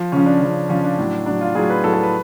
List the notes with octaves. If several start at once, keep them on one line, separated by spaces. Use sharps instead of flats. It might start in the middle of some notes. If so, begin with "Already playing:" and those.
Already playing: F3
C#3 F3 C#4
D4
C#3 F3
C#3 F3 C#4
D4
A2 F#3
A2 F#3 D4
F4
A2 F#3 G#4
B4
A2 F#3 A4
A4
B4